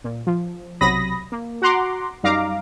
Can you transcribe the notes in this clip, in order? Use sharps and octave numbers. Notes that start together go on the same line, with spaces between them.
A#2
F3
B1 C3 F#3 B5 D#6 A#6
A#3
F#4 F#5 A#5 C6 D6
F#2 G3 D#4 F5 A#5 D6